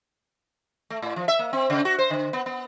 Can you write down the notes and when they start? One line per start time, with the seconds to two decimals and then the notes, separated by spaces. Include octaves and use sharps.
0.90 A3
1.02 A2
1.16 F3
1.28 E5
1.39 A#3
1.53 C4
1.70 C#3
1.85 F#4
1.99 C5
2.10 D3
2.33 B3
2.46 B3